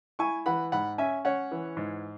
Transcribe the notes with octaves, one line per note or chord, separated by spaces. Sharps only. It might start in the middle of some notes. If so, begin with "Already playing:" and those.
E4 G#5 C#6
E3 F#5 B5
G#2 F#5 B5
C#4 E5 G#5
C#4 C#5 F#5
E3
G#2